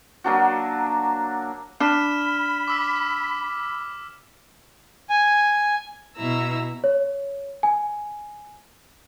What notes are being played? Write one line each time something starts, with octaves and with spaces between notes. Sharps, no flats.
F#3 A#3 D4 F#4
D4 B5 F6 E7
D6 E6 B6
G#5
B2 E4 A#5 E6
C#5
G#5